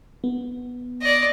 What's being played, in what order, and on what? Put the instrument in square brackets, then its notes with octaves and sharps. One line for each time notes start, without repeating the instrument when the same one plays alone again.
[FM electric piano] B3
[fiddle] D5 D#5